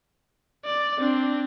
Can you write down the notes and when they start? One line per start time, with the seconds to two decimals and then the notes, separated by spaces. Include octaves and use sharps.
0.64 D5
0.98 C4 D4